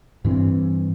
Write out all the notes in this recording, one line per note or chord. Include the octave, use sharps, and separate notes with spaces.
G2 E3 C4